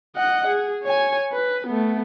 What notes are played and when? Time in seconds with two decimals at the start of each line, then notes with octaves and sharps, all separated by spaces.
0.16 D#5 F#5
0.47 G#4
0.84 C#5 G#5
1.33 B4
1.67 A3 B3